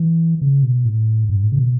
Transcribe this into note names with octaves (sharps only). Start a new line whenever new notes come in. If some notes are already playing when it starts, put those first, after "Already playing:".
Already playing: E3
C#3
B2
A2
G2
A2
C#3
B2